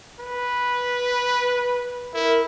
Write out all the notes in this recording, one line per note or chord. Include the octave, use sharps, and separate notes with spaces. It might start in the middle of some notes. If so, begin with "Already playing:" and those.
B4
E4 A#4